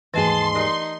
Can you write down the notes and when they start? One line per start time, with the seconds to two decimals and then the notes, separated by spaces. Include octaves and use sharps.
0.14 D#2 G#2 E3 A3 G#4 A5 C6
0.55 D#4 G4 A#4 D5